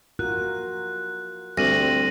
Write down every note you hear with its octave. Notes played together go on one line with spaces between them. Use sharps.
F4 F#4 A#4 F#6
D2 G3 C4 A#6 D#7 F#7